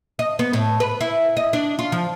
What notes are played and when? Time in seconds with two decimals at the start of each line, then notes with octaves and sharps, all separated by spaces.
0.19 D#5
0.39 B3
0.53 A2
0.80 B4
1.01 E4
1.37 D#5
1.53 D4
1.79 F4
1.92 F3